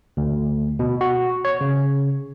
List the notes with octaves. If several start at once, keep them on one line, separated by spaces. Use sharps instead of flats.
D2
B2
F#4
C#5
C#3